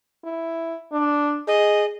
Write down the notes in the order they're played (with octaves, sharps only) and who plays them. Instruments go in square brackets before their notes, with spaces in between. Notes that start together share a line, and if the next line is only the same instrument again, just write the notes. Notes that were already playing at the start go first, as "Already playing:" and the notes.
[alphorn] E4
D4
[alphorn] G#4 [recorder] D#5